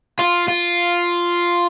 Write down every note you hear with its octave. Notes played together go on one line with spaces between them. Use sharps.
F4
F4